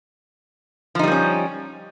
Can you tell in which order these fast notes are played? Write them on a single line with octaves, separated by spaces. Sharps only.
F3 D#4 G3 A#3 C#4